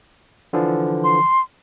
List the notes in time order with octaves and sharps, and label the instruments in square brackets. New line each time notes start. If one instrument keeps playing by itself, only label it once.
[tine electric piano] D3 E3 F3
[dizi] C6